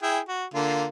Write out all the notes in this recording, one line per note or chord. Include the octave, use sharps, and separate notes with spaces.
E4 G#4 G5
F#4
D3 A#3 F4